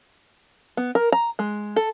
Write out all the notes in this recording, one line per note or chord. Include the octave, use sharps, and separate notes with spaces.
B3
A#4
A#5
G#3
A4